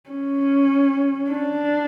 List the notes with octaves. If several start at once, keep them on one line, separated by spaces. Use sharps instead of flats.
C#4
D4